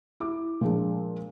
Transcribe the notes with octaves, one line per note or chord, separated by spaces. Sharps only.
E4 D6
A#2 F3 G#3 D4